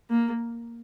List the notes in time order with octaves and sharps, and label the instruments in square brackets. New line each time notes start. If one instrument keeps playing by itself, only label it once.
[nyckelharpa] A#3